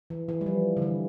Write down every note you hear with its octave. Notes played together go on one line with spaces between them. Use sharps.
E3
E3
G3
F3
D3
E3